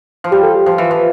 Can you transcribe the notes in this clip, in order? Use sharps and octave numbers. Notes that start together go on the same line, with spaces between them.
F3
G3 G4
A4
G4
F3
E3
F3